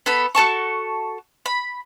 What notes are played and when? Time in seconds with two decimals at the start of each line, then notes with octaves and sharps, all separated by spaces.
0.06 B3 A4 B5
0.35 F#4 A4 A5 C#6
1.46 B5